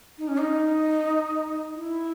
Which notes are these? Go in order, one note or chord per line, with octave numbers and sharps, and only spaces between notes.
D#4
C#4
D#4
E4